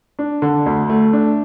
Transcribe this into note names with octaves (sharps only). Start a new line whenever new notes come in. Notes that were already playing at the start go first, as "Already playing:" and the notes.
D4
D3
D2
A3
D4